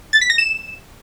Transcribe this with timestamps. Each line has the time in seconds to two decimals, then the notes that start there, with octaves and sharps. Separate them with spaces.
0.13 A6
0.21 B6
0.30 A#6
0.38 E7